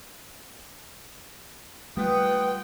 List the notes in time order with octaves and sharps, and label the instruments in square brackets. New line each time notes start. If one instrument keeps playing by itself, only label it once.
[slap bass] G3 A3 [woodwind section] F4 F#5 D#6 [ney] B4 [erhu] G5